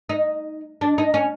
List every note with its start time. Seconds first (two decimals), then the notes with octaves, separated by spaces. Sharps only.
0.09 D#4
0.81 D4
0.98 D#4
1.14 C#4